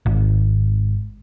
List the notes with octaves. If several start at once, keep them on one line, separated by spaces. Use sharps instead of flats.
G#1